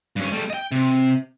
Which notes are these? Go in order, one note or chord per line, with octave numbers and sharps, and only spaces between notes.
G2 C#4
G3 A3
D#5 G5
C3